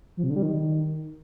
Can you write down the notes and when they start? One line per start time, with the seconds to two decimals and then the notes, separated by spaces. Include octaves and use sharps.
0.17 F3
0.24 C3
0.30 D3
0.36 G3
0.42 D#3